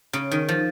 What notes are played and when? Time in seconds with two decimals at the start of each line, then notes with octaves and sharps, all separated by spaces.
0.13 C#3
0.31 D#3
0.49 F3